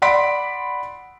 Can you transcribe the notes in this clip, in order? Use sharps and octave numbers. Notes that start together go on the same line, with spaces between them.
D5 F#5 B5 C6 B6 D7